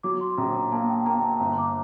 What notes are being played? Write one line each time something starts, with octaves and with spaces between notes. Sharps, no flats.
F#3 D6
C6
A#1 A#5
A#5
A#3 A5
G5
A#3 A#5
A5
G1 A#5
D6